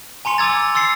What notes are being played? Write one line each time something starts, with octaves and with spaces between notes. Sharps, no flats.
G#5 A#5 C6 C#7 F7
G#5 D6 E6 G#6 A6
C6 E6 A6 C7 C#7